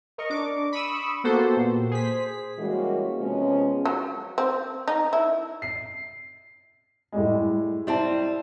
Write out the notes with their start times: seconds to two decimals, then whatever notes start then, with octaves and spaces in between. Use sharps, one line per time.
0.18 A#4 D#5 C#6
0.30 D4 D6
0.72 B5 C#6 D#6 E6
1.24 A#3 B3 F#4 G4 A4 C5
1.57 A#2
1.91 G#4 C5 B6
2.58 E3 G3 G#3 A#3 C#4 F#4
3.19 C3 F3 G#3 B3 C#4
3.85 F#3
4.38 C4
4.88 D#4
5.13 E4
5.62 C7
7.12 A2 G3 G#3
7.87 G3 C4 E4 A5